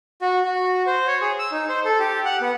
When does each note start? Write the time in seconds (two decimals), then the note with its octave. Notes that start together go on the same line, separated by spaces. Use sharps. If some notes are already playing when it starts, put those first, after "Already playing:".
0.22 F#4
0.44 F#4
0.86 C5
1.07 C#5
1.22 G#4
1.39 E6
1.52 D#4
1.69 C5
1.85 A4
1.99 G4
2.25 F#5
2.41 B3